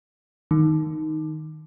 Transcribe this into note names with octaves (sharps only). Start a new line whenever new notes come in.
D#3